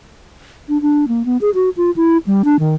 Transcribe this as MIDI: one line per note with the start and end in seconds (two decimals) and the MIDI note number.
0.69 0.80 62
0.82 1.08 62
1.08 1.25 58
1.25 1.37 59
1.41 1.50 68
1.54 1.69 66
1.77 1.91 65
1.96 2.17 64
2.27 2.42 55
2.45 2.59 62
2.59 2.75 51